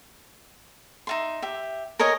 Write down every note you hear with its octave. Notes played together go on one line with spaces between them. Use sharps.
D#4 E5 C6
G4 E5
A#4 C#5 D#5 G#5